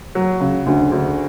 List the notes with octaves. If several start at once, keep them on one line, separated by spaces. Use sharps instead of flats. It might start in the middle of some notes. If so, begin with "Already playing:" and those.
F#3
C#3
D2
D2